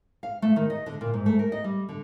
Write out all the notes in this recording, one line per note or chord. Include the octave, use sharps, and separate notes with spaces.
F5
A3
D#3
D#5
D3
A#2
G#2
A3
A#4
D#5
G3
D3